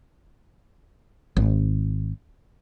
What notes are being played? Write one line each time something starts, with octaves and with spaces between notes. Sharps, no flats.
G#1